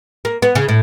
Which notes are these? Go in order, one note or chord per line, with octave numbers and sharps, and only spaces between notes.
A#3
B3
C#3
A2